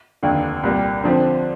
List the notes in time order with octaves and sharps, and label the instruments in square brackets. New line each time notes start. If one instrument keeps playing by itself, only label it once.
[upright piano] F1 D#2 D3
C2 A#2 G3 A#3
D3 F3 C4